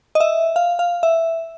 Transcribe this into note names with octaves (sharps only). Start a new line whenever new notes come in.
D#5
E5
F5
F5
E5